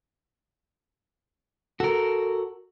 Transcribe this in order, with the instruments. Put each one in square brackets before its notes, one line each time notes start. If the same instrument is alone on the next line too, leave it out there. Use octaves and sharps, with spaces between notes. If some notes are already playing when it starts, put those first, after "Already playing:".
[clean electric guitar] F#4 A#4 [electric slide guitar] A4